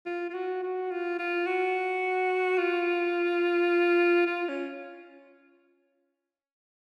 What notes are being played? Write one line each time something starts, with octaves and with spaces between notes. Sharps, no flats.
F4
F4
F#4
F#4
F4
F4
F#4
F4
F4
C#4